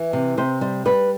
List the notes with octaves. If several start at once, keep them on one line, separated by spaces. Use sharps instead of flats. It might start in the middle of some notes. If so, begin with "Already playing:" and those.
Already playing: E3
C3
C3 C5
G3 C5
G3 B4